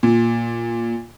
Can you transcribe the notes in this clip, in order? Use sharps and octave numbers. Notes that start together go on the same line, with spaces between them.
A#2